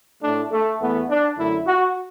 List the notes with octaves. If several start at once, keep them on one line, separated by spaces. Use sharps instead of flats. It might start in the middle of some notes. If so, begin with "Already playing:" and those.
A2 A3 D4
A3
E2 E3 A3 B3
D4
F#2 D3 A3 E4
F#4